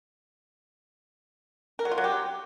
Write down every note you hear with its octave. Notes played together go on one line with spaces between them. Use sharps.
A#4
F#3
F4
F#3
G4